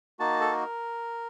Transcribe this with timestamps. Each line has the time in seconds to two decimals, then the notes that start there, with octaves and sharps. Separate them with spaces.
0.19 A#3 D#4 F#4 A5
0.41 A4
0.51 A#4